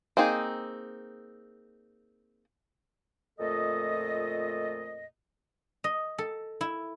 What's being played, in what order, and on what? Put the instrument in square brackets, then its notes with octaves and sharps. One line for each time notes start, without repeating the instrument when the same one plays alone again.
[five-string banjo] A#3 C4 D#4 G#4
[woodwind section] F2 A#2 A3 A4 D#5
[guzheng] D#5
A4
E4